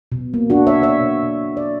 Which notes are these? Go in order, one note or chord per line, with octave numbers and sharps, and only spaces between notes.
B2
A#3
D4 F#4
B2
C#5 E5
B2
C#5 E5
B2
B2
A#3
D5